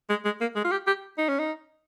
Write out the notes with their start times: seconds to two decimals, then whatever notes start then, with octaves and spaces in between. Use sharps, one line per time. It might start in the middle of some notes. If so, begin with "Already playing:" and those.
0.10 G#3
0.25 G#3
0.41 A#3
0.56 G#3
0.65 F4
0.71 G4
0.87 G4
1.18 D#4
1.29 C#4
1.40 D#4